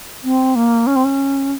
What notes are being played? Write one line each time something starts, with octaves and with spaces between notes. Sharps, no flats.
C4
A#3
C#4
C4
C#4